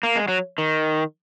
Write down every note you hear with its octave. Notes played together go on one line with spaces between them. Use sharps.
A#3
G#3
F#3
D#3